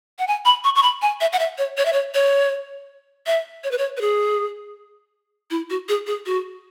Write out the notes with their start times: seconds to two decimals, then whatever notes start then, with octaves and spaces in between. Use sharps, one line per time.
0.19 F#5
0.27 G#5
0.45 B5
0.64 C#6
0.75 C#6
0.83 B5
1.02 G#5
1.21 E5
1.33 F#5
1.39 E5
1.58 C#5
1.77 C#5
1.85 E5
1.93 C#5
2.15 C#5
3.27 E5
3.64 C#5
3.71 B4
3.78 C#5
3.97 B4
4.01 G#4
5.51 E4
5.70 F#4
5.89 G#4
6.07 G#4
6.26 F#4